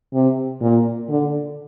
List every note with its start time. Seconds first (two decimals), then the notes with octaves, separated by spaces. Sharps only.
0.13 C3
0.61 A#2
1.09 D3